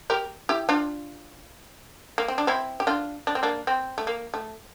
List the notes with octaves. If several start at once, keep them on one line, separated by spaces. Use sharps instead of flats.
G4 A#4
E4 G4
D4 F4
A#3
C4
D4
C4 E4
G4
D4 F4
D4
C4
A#3 D4
C4
A3
A#3
A3